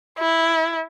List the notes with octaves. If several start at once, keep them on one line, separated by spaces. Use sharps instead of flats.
E4